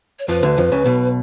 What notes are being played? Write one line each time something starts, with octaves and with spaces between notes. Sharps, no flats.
C#5
F2 F3 B4
D2 D3
F2 F3
C#2 C#3
B1 B2